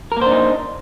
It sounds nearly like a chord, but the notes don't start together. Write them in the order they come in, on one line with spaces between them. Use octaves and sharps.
A#4 A#3 C5 D4 D#4